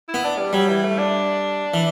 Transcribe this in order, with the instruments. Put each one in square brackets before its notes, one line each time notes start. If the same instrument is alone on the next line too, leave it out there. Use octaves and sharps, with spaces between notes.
[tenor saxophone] E4
[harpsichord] B3
[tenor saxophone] D4
G3
[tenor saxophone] F#3 [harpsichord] G3
[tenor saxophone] E3
A3
D4
[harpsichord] E3